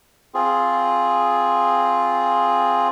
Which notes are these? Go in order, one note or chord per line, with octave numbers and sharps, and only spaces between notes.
C4 F4 G#4